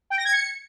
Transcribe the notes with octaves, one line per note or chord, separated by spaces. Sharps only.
G5
A#6
G#6
C#7